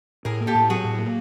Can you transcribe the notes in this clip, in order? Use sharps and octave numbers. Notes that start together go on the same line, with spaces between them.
A2 G#4 A#4
A#3
G4 A4
A2
F#3 F#4 G#4
A2
A#3